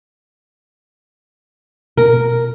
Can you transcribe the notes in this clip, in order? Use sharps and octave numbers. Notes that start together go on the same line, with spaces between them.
B2 A#4